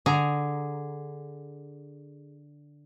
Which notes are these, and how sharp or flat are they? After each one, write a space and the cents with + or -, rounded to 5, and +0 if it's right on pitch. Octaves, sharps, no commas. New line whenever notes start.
D3 +0 G#4 +0 A#5 +0